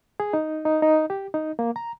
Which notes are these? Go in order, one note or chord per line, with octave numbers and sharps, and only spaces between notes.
G#4
D#4
D#4
D#4
G4
D#4
A#3
A#5